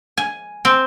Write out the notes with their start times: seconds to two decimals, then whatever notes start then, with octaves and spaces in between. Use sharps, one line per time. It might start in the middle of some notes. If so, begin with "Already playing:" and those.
0.17 G#5
0.65 C4